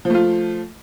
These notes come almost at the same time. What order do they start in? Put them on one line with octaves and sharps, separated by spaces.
F3 A3 F4